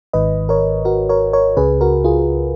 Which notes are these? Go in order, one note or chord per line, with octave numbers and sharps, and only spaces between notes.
G#1 G#2 D#3 B4 D#5
A#4 C#5
F#4 A#4
A#4 C#5
A#4 C#5
C#2 C#3 G#4 B4
F#4 A#4
F4 G#4